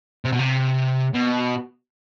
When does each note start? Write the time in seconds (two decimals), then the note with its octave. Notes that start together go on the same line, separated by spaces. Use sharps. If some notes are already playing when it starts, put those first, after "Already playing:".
0.25 C3
0.32 B2
0.39 C3
1.14 B2